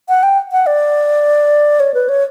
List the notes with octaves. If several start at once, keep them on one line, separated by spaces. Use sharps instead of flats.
F#5
G5
F#5
D5
C#5
B4
C#5